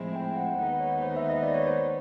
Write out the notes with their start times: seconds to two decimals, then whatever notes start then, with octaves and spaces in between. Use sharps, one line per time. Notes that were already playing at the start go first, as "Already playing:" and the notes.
Already playing: A2 F3 G#3 C4 E4
0.16 G5
0.36 F#5
0.58 D#2 D#3 G#3 B3 D#4 F#5
0.80 C#5
1.02 C5
1.16 E5
1.29 D#5
1.43 D5
1.54 C#5
1.67 C5